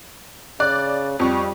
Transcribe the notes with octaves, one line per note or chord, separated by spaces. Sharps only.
C#3 D5 F#6
F2 G3 F4 C#6